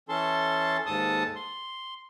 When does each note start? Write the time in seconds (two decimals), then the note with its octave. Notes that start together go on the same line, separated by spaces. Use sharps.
0.09 E3 C#4 A4 A5 C6
0.86 D#2 G#2 A4 A5 D#6
1.36 C6